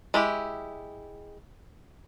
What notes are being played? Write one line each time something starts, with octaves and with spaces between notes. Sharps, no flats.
G#3 E4 G4